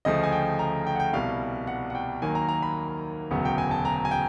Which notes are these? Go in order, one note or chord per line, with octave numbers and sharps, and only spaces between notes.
D2 C#3 F3 A3 D#5
G#5
G5
A#5
G5
F#5
G5
C2 B2 G3 F5
F#5
F#5
G5
D#2 D#3 F#3 A#3 G#5
A#5
A#5
B5
E1 D2 C#3 F#3 B3
G5
G#5
A5
A#5
G#5
G5